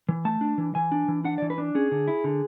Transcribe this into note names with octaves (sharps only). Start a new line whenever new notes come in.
E3
A3 A5
D4
E3
E3 G#5
D4
E3
D4 F#5
D5
E3
B4
D4
C#4 G#4
D3
E4
D3